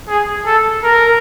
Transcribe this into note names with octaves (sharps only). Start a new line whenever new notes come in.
G#4
A4
A#4